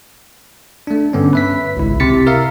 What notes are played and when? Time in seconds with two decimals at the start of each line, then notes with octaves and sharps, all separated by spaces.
0.87 A3 D4
1.13 G2 D3 B3 C#4
1.33 B4 E5 B6
1.77 G#1 C#2 E4
2.00 C3 E4 A6 B6 C#7
2.27 A#4 E5 F5